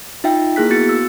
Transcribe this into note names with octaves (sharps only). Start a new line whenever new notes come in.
D#4 F4 E5 G5
A#3 E4 G#4 F#6 B6
B3 F#4 A6 C#7
E6